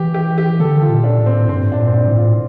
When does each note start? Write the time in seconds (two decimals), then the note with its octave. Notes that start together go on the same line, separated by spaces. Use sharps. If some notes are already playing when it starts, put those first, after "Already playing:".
Already playing: E3 G4
0.14 G4
0.38 G4
0.60 D3 A4
0.81 F4
0.89 A#2
1.04 D4
1.19 A2
1.26 C4
1.49 G2 C4
1.72 D4
1.78 A#2
1.87 C4
1.94 D4
2.08 A2
2.16 F4